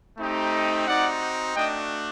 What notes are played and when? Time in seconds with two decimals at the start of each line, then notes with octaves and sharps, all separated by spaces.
0.18 A3 C4 D#4 G4
0.86 C4 D#4 F#4 D5 F#5
1.55 A3 D4 F#4 D#5 G5